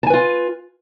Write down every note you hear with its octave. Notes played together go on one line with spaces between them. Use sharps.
F4 B4 G#5 A5